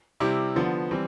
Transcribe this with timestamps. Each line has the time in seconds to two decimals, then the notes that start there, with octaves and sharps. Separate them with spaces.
0.20 C3 G3 C4 E4 G4
0.56 D3 F3 B3
0.91 E3 G3 C4